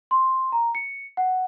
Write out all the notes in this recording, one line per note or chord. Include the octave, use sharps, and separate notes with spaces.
C6
A#5
C#7
F#5